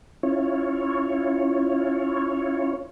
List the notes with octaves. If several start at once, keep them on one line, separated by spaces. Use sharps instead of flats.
C#4 E4 F4 C#5